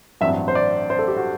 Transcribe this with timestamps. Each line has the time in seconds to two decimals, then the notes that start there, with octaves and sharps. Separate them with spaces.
0.21 A1 G2 F#3 C4 E5
0.48 C5
0.55 D5
0.90 C5
0.99 A4
1.08 G4
1.17 F#4